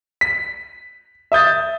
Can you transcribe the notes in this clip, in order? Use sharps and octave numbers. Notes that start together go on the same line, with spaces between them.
B6
E5 D#6 G6 A6